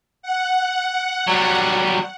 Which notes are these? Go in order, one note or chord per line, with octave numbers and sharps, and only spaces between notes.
F#5
F#3 G3